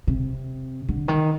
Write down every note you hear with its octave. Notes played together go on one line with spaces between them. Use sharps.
C3
D3
D#3